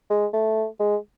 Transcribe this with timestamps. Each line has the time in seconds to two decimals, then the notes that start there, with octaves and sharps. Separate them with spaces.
0.10 G#3
0.33 A3
0.80 G#3